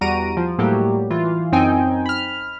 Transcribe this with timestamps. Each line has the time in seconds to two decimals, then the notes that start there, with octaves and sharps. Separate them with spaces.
0.01 E2 G3 F#4 A#5 D7 D#7
0.37 F3
0.59 A2 F#3 G3 A#3 G4
1.10 E3 F4
1.52 F#2 C4 D#4 G5 G#5
2.06 B5 F6